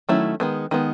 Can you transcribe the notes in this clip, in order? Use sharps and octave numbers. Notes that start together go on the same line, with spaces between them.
D#3 F#3 A3 C#4 E4
D#3 G#3 B3
D#3 G#3 B3